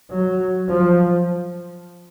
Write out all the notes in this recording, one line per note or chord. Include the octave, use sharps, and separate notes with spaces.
F#3
F3